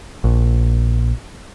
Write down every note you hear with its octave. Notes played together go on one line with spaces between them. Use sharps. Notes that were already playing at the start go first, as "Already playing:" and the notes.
A#1